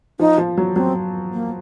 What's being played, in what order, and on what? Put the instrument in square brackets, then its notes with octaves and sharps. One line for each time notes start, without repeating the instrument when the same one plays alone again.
[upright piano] F3 [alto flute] D#4
[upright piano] F3
F#3
[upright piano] F#3 [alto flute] C4
[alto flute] A#3